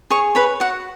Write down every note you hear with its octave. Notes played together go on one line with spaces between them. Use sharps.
G#4 C#5 C#6
B4 C#5 B5
F#4 F#5